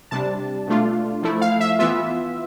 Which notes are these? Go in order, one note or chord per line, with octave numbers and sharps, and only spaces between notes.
C3 G3 D4 A5
B2 A3 D4 F4
F3 A3 E4
F5
E5
E3 B3 F4 E5